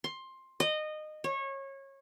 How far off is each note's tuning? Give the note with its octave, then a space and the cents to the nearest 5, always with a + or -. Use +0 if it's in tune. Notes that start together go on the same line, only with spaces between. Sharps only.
C6 +15
D#5 -20
C#5 -25